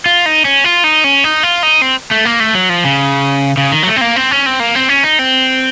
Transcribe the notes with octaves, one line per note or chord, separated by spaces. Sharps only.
F4
D#4
C#4
F4
D#4
C#4
D#4
F4
D#4
C4
A3
A#3
A3
F#3
F3
C#3
C#3
D#3
F#3
A3
C4
A#3
C4
C#4
C4
A#3
C4
C#4
D#4
C4